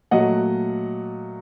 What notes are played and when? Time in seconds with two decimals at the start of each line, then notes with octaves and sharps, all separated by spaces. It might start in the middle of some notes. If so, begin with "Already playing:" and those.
0.11 A#2 F#3 A3 D#5 F#5